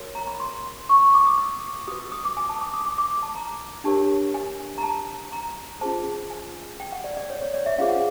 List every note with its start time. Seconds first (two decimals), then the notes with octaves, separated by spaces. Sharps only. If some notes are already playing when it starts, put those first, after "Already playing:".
Already playing: F#4 A#4 C#5
0.15 A#5
0.27 B5
0.40 C6
0.89 C#6
1.02 C#6
1.14 D6
1.26 D#6
1.38 E6
1.88 F#4 D#6
1.92 B4
2.00 E6
2.12 D#6
2.25 D6
2.37 G#5
2.49 A5
2.56 D#6
2.61 D6
2.73 D#6
2.86 D6
2.98 D6
3.23 A5
3.35 A#5
3.84 D4 G4 A#4 C#5 A5
4.34 G#5
4.78 A#5
4.83 A5
5.32 A#5
5.81 C#4 F4 G#4 C5 A5
6.30 G#5
6.80 G5
6.92 F#5
7.04 D5
7.17 D5
7.30 C#5
7.42 C#5
7.54 D5
7.66 E5
7.78 C#4 F4 G#4 C5 F5
7.89 F#5